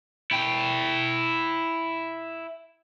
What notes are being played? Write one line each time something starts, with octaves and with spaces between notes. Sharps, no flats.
E4 G5